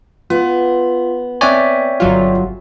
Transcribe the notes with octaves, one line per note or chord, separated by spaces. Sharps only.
B3 F4
C4 C#5 D5 E5 G5 G#5
G1 F#3 F4